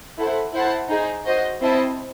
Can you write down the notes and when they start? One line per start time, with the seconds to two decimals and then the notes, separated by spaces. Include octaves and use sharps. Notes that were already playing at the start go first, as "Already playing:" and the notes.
0.18 E4 A4 C5 F#5
0.54 E4 C5 F#5 A5
0.89 D#4 G#4 C5
1.26 F#4 C5 D#5
1.62 C4 E4 C5 D#5 A5